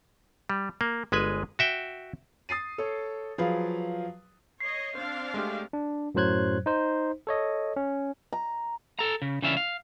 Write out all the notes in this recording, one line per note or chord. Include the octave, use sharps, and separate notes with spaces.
G3
A#3
G1 G#3 B4 G#5
F#4 E5 G5
D#6 A6 C7 D#7
A4 C#5
F3 F#3 G#4 B4 F5
C#5 D#5 C7
C4 D4 C5 F5
G#3 A3 G4
D4
F#2 A2 F#3 C5 F#6 G#6
D#4 C5
A4 C#5 D#5
C#4
A#5
A4 A#5
C#3
C#3 E3 C#4 D4 E5 F5
F5